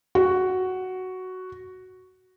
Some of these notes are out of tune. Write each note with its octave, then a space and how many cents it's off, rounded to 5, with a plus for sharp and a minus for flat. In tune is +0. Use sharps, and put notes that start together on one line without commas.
F#4 +5